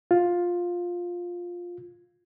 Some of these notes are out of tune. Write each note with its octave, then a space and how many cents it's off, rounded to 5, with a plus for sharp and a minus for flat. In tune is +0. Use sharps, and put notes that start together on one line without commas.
F4 +10